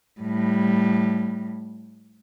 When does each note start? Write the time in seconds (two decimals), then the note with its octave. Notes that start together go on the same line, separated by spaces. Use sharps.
0.21 A2 G3